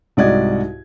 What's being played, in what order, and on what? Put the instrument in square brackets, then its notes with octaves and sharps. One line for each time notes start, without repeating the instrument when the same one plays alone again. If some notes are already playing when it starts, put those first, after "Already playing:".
[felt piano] C2 G#2 F#4 D5 D#5 G#6